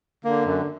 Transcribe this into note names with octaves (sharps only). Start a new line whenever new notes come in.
D3 A#3
F#2